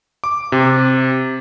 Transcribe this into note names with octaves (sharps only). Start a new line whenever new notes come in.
D6
C3